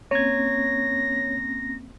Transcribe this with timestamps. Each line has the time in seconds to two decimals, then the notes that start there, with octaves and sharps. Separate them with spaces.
0.11 A#3 C4 C#4 C#5 G#6 A#6